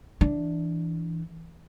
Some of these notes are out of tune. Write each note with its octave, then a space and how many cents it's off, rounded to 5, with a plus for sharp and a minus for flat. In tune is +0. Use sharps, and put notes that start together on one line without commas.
E3 +0 D4 +0